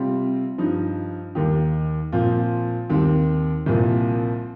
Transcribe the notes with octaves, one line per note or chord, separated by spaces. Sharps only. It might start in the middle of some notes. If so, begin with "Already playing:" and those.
Already playing: C3 G3 C4 F4
G2 F3 D#4
D#2 D#3 A#3 D#4 G4
A#2 F3 C4 F4
D#2 D#3 C4 G4
C2 A#2 F3 A#3